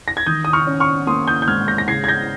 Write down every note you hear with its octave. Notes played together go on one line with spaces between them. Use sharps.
A#6
G#6
D#3 D#6 G6
D#6
C#6 F6
C#4
C#6 F6
A#3 C6 D#6
D#6 G6
G6
G#2 F6 G#6
G6 A#6
A#6
C#3 G#6 C7
G#6
G6 A#6